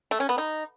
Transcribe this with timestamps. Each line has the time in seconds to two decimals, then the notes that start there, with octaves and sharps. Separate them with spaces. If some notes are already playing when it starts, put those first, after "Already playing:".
0.11 A3
0.20 C#4
0.29 B3
0.38 D#4